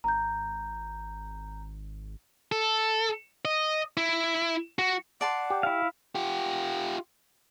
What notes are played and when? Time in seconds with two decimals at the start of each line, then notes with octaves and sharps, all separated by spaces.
0.04 G#1 A#5 G6
2.52 A4
3.45 D#5
3.97 E4
4.79 F#4
5.21 D5 F#5 A5 C6
5.50 G4
5.63 E4 F5
6.15 F4 G4